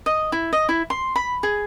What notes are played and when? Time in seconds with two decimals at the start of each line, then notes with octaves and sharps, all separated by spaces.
0.06 D#5
0.32 E4
0.53 D#5
0.69 E4
0.90 C6
1.16 B5
1.43 G#4